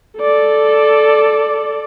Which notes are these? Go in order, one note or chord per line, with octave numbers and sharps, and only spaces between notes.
A4 D5